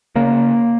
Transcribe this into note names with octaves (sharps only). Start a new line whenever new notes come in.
C#3 A#3